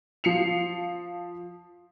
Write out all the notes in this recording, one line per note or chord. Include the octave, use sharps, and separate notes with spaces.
F3 C7 C#7 F7